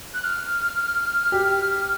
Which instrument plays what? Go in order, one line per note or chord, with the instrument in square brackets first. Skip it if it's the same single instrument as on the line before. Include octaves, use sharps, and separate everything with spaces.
[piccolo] F#6
F6
[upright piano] G4